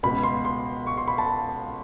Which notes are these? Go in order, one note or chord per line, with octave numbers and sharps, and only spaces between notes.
C#2 B2 B5
C6
C6
C#6
C6
B5
A5